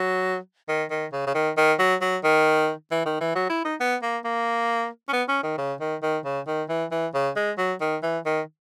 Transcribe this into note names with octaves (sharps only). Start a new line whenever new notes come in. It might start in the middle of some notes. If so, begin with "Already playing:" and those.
Already playing: F#3
D#3
D#3
C#3
C#3
D#3
D#3
F#3
F#3
D#3
E3
D#3
E3
F#3
E4
D#4
B3
A#3
A#3
C#4
B3
C#4
D#3
C#3
D#3
D#3
C#3
D#3
E3
E3
C#3
G#3
F#3
D#3
E3
D#3